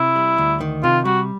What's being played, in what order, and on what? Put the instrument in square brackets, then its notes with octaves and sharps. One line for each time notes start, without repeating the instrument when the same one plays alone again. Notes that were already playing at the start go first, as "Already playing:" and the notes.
Already playing: [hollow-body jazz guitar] C3 [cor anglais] E4
[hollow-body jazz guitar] G3
D2
D#3
[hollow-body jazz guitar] C3 [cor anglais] F4
[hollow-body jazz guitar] G3 [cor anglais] F#4